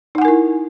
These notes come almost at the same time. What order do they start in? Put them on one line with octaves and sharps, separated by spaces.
D#4 F#5 G#5 A#4 E4